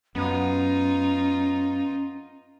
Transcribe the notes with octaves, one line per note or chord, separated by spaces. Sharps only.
F#2 B3 C#4 D#4 F4